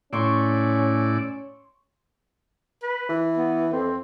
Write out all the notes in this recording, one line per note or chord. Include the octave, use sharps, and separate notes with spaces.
A2 C#4 E4 D5 C6 C#6
B4
E3
B3
F2 C4